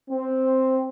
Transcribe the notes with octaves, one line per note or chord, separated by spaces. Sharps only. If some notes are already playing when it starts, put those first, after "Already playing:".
C4